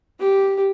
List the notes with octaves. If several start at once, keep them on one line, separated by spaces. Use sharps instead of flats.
G4